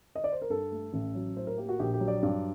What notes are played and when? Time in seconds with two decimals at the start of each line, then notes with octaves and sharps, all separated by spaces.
0.15 D#5
0.24 D5
0.32 C5
0.42 A#4
0.50 G2 A4
0.72 A3
0.93 A1
1.15 F#3
1.36 A2 C5
1.47 A#4
1.58 A#3 G4
1.69 F#4
1.79 A#1 G4
1.94 G4
2.00 F#3
2.08 D5
2.23 G2